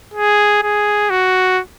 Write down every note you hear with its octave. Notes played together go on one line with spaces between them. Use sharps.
G#4
G#4
F#4